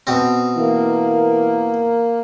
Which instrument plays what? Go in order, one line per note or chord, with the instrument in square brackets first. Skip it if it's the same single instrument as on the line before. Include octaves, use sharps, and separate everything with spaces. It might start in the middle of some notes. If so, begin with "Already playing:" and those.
[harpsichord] B2 C4
[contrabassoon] E3 [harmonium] A#3